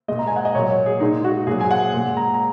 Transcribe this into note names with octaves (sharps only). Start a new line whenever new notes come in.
A#2 G#3 D#5
A#5
G#5
F#5
D#5
A#2 F#3 C#5
G#4
A#2 G#3 D#4
F#4
A#2 F#3 G#4
G#5
F#5
A#2 G#3
A#5
A#5